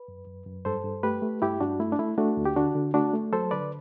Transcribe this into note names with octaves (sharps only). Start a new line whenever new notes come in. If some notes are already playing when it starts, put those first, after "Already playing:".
Already playing: B4
F#2
F#2
F#2
G2 A4 C5
G2
A3 G4 B4
A3
G2 E4 G4
G2 D4 F#4
A3 E4
D4
A3 E4
A3 D4 F#4
D2
G4
D3 D4 F#4
D3
A3 D4 F#4
A3
F#3 A4 C5
D3 B4 D5